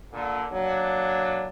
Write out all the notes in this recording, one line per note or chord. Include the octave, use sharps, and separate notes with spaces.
A#2 D3
F#3 A#3 D4